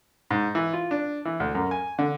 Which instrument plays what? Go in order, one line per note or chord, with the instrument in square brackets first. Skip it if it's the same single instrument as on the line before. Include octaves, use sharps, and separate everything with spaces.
[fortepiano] G#2
E3
F4
D4
E3
D2
F#2
G#5
D3